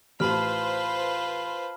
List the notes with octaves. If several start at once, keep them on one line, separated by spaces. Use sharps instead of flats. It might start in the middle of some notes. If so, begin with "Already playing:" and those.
A1 F4 B4 C5 A5 B5 F6